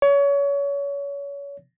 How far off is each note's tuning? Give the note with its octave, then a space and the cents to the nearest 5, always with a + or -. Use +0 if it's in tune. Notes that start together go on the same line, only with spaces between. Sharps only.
C#5 +30